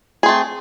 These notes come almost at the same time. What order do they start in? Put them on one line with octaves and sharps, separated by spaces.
G#4 C4 A3